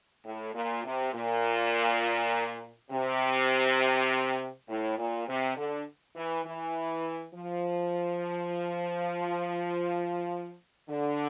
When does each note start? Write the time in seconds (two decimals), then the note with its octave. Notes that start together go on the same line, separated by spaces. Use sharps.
0.25 A2
0.54 A#2
0.85 C3
1.14 A#2
2.91 C3
4.69 A2
4.98 A#2
5.28 C3
5.57 D3
6.16 E3
6.45 E3
7.35 F3
10.89 D3